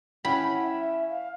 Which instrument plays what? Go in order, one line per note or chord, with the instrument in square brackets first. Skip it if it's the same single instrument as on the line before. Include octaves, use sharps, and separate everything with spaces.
[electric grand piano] C#4 E4 G5 [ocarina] F#5 [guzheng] B5
[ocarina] E5
F5